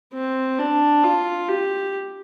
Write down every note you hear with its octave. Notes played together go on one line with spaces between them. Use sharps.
C4
D4
F4
G4